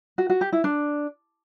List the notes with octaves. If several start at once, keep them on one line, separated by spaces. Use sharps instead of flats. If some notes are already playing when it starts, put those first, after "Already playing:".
F#4
F#4
G4
E4
D4